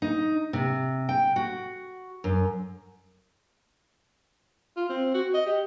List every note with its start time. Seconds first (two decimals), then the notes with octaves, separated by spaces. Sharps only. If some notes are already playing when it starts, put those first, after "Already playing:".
0.02 D#4
0.53 C3
1.09 G5
1.36 F#4
2.24 F#2
4.77 F4
4.89 C4
5.14 F#4
5.34 D#5
5.46 G4